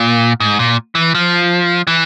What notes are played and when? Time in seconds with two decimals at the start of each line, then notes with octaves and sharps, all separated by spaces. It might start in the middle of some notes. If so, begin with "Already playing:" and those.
Already playing: A#2
0.40 G#2
0.59 A#2
0.95 E3
1.15 F3
1.87 E3